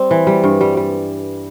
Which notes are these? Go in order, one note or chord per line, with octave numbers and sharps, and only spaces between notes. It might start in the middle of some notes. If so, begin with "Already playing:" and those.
Already playing: G3 C4
E3
G3
G2
G3
G3